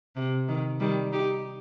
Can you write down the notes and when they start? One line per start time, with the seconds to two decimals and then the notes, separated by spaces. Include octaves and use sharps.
0.16 C3
0.48 D#3
0.80 D#3 G3
1.12 D#4 G4